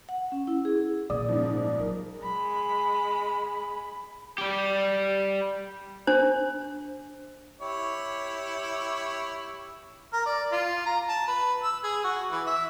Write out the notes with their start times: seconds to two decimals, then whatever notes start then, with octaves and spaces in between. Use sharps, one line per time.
0.09 F#5
0.32 C#4
0.47 E4
0.65 G#4
1.10 A#2 D3 D5 D#6
1.29 G#2 C#3 F3
1.79 F#3 A#4
2.20 G#3 B5
4.38 G3 G4
6.07 D4 C5
7.61 E4 G4 C#5
10.13 A#4
10.26 D5
10.52 F4
10.86 A#5
11.09 A5
11.28 B4
11.63 E6
11.83 G#4
12.04 F#4
12.31 E3
12.46 E5